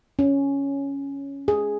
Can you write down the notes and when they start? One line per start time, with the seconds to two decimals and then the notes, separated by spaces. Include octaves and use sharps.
0.19 C#4
1.48 G#4